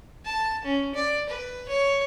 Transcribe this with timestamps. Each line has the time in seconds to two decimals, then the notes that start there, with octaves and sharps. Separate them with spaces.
0.25 A5
0.65 C#4
0.95 D5
1.29 B4
1.68 C#5